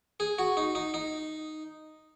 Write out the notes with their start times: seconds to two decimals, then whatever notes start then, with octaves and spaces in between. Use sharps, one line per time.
0.20 G#4
0.38 F#4
0.57 D#4
0.75 D#4
0.94 D#4